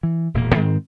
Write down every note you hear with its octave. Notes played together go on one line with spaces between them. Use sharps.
E3
E1 A#2 A#3
G#2 D#3 G#3 C4